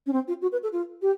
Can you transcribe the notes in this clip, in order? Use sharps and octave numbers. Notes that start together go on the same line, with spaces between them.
C#4
C4
F4
F#4
B4
A4
F4
G4